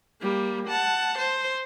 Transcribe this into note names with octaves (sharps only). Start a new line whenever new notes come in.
G3 A#3
F#5 A5
C5